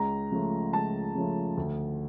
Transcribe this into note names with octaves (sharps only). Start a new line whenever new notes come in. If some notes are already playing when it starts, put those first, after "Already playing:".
Already playing: C#2 A#5
C#3 F3 A3
C#2 A5
C#3 F3 A3
D2